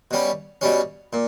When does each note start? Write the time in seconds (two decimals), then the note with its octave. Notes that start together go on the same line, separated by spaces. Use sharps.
0.11 B2 G3 C#4
0.61 B2 G3 C#4
1.13 A#2